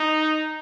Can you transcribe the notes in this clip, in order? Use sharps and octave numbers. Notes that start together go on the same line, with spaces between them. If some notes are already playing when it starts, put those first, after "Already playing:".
Already playing: D#4